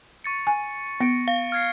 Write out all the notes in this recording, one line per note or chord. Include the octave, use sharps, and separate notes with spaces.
C#6 A6 C#7
G#5
B3 A#6 C#7 D7
F5
F6 G#6 C7